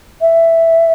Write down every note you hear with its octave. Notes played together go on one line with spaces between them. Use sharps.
E5